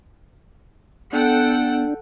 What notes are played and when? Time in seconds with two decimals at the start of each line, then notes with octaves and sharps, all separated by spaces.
1.13 B3 D4 A4 F#5 G5